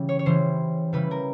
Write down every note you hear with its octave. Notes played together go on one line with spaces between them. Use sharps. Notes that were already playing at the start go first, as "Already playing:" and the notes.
Already playing: C#3 E3 G3
C#5
C#5
C#3 E3 G3 C5
C#3 E3 G3 B4
A#4